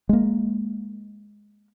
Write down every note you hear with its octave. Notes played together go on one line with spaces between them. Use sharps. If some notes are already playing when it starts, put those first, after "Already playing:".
G#3 A#3